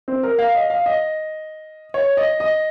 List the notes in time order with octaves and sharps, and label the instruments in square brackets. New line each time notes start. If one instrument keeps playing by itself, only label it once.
[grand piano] C4
A#4
F5
D#5
F5
D#5
C#5
D#5
D#5